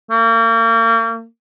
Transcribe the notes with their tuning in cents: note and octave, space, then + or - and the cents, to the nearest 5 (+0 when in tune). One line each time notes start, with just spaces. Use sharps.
A#3 -40